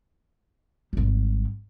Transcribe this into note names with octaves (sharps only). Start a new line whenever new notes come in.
G#1 G3